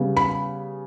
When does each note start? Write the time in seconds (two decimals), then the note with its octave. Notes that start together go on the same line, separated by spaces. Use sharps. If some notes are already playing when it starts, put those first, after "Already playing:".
Already playing: C#3 G3 B3
0.17 B5